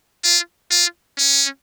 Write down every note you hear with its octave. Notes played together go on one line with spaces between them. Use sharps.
F4
F4
C#4